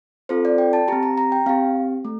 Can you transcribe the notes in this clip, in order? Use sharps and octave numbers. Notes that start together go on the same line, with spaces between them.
C4 F4 A4 C5
D5
G5
A5
C4 G4 A#5
A#5
A#5
G5
C4 G4 F5
A3